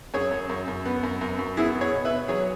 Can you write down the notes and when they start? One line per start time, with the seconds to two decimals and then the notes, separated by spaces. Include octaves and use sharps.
0.14 F#2 G#4 C#5
0.31 F#2
0.50 F#2
0.68 F#2
0.86 B3
1.03 F#2
1.21 F#2
1.39 F#2
1.57 B3 E4 G#4
1.75 B3
1.81 G#4 C#5
1.93 B2
2.05 B4 E5
2.11 B3
2.28 F#3 G#4 C#5